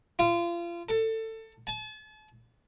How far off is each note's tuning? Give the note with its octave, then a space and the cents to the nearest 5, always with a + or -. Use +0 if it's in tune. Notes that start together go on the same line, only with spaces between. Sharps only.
F4 -30
A4 +20
A5 -40